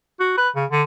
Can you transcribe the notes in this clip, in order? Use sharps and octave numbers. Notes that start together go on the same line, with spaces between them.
F#4
B4
C#3
D3